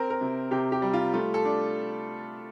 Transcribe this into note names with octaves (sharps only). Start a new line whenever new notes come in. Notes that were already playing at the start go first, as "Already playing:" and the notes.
Already playing: C4 A#4
A#4
C3
C3 G4
G4
G3
F4
A3 F4
A4
D4